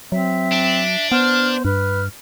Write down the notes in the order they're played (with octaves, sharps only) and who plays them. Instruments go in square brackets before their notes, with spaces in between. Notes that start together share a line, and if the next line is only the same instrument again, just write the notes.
[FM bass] F#3 [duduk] C4 [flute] E5
[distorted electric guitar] D4
[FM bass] B3 [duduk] C5 [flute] F6
[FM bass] G2 [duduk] B4 [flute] F6